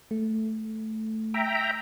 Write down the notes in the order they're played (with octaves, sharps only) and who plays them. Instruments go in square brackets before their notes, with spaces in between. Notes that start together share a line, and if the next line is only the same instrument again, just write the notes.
[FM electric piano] A3
[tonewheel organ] E5 G5 A#5